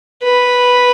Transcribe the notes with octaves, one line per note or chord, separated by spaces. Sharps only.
B4